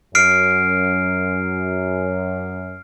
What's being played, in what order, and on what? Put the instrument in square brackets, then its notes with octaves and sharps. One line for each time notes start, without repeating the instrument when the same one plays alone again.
[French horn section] F#2 [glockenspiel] F6 C7 D7